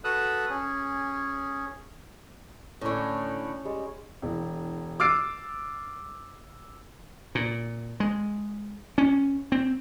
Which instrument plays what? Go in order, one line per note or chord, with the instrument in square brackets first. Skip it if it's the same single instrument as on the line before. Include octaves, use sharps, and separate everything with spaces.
[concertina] F#4 A4 B4 D#6 E6 F#6
C#4 G#4
[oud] A2 D3 [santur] C#4 C#5
[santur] G3 G#3
[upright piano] E1
D6 E6 F6 A6 C7 D7
[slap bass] A#2
G#3
C#4
C4